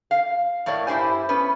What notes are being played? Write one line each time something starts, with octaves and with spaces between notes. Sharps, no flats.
F5
A2 A3 A#3 C#5 D5
G2 E4 G4 C5 G#5
B3 C#4 B4